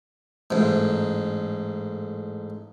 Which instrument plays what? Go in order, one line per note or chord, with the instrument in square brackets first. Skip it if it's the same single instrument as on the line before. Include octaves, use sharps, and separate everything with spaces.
[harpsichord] A1 G#2